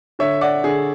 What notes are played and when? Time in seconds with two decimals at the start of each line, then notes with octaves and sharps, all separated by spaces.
0.19 D3 C#5 E5
0.41 D5 F#5
0.64 D3 G#4